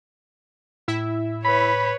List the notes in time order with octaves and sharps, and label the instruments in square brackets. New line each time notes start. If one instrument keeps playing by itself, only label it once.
[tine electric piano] A2 [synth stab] E4 E5
[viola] B4 C#5 [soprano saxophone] B5